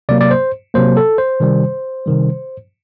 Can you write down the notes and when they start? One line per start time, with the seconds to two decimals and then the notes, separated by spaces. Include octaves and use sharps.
0.09 C3 F#3 A#3 D5
0.21 D5
0.31 C5
0.74 C3 F#3 A#3 C5
0.97 A4
1.18 C5
1.40 C3 D#3 G3
2.06 C3 D#3 G3